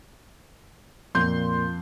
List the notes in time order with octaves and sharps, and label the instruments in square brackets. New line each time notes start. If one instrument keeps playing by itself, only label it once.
[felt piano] F2 [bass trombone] A#2 [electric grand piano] C6 G6